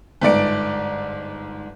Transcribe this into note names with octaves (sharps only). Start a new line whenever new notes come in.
G1 G#2 D5 D7